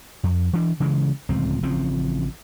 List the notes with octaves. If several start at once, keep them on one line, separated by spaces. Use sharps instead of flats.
F2
E3 D4
C#3 E3 G#3
D1 C#2 F3 C4
A1 C#3 F3 C4